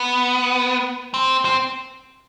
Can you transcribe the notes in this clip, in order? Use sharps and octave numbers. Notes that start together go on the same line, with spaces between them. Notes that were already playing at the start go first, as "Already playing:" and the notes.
Already playing: B3
C4
C4